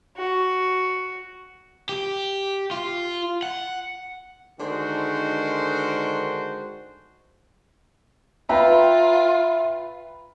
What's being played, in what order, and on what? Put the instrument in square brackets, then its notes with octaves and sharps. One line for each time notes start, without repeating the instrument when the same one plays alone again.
[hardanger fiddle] F#4
[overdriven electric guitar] G4
F4
F#5
[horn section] D3 D#3 G#3 D4 F#4 C5
[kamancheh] F4 [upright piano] B4 G5 A#5 [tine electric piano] E5